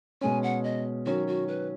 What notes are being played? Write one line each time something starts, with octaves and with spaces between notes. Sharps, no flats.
B2 G#3 C#4 G#5
F#5
D#5
D#3 F#3 C#4 F#4
F#4
B4